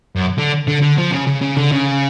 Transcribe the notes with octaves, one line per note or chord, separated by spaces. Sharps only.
F#2
D3
D3
D3
F3
C#3
C#3
C#3
D3
C#3